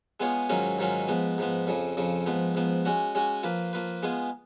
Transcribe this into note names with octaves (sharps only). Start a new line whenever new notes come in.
G#3 B3 F4 G#4 C#5
G#2 D#3 F#3 C#4 F4
G#2 D#3 F#3 C#4 F4
G#2 F3 B3
G#2 F3 B3
F2 C#3 F3
F2 C#3 F3
G#2 F3 B3
G#2 F3 B3
G#3 C#4 F#4
G#3 C#4 F#4
F3 A#3 F4 B4
F3 A#3 F4 B4
G#3 B3 F4 G#4